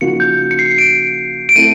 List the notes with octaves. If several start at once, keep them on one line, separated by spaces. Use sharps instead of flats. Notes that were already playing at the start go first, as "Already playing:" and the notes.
C#3 F3 A#3 D#4 F#4 C#7
G6
C#7
C7
D7
D7
A3 C4 E4 A4 D#7